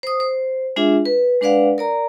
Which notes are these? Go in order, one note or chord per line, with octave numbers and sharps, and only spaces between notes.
C5 D#6
C5
G#3 D4 F4 G#4 E5
B4
G#3 D4 B4 D5 F5 F#5
A#4 D5 A#5